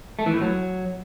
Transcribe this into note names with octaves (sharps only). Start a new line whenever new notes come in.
A3
E3
A2
F#3